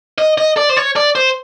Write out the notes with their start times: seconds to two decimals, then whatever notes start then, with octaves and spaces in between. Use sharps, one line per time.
0.18 D#5
0.38 D#5
0.57 D5
0.69 C5
0.76 C#5
0.96 D5
1.15 C5